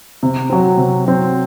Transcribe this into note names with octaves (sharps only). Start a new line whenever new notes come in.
C3
F#3 C4
C3
F#3 C4